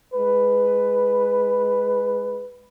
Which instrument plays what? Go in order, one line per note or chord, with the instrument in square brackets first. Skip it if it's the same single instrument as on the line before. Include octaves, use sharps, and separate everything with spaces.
[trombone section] G#3 B4